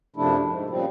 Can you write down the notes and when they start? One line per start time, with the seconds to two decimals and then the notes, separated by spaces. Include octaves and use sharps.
0.16 F#2 C3 F3 A3 D4 E4
0.47 G#2
0.70 A#2 C#3 F3 G3 C4